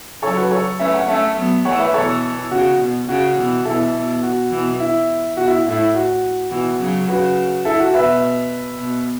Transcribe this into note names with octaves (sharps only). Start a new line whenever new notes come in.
C#3 F#3 A4 C#5
F#4 B4
A4 C#5
A3 C#4 B4 E5
C#5 F#5
A3 C#4 E5 A5
F#3 B3
E3 A3 C#5 F#5
B4 E5
B2 E3 A4 C#5
C#3 F#4
B2
C#3 F#4
B2 E3
B2 E3 E4 A4
B2
F#4
B2 E3
E4
B2 F#4
E4
A2 E4
F#4
B2 E3 F#4
C#3 F#3
C#3 F#4 B4
E4 A4
F#4
B2 B4 E5
B2